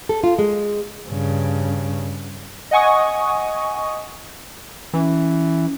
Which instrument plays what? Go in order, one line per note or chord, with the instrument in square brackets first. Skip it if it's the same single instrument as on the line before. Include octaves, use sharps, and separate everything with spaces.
[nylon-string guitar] A4
F4
G#3
[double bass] G2 C#3
[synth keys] D#5 F#5 G#5 C#6 D#6
[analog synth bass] E3 [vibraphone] C#4